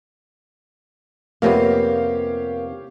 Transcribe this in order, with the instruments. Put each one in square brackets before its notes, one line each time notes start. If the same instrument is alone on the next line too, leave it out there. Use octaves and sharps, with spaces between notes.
[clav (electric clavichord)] F2 C3 B3 [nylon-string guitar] A#3 [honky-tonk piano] G4 C#5 F5